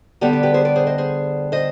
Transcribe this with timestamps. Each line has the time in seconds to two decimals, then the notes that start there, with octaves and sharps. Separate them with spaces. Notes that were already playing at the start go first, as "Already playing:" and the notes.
0.21 D3 G3 B3 G4
0.33 G4
0.43 G4 B4
0.54 G#4 C5
0.65 B4 D5
0.76 G#4 C5
0.87 C5 D#5
0.98 G#4 C5
1.52 C5 D#5